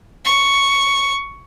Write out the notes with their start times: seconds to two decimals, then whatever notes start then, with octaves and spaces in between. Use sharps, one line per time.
0.24 C#6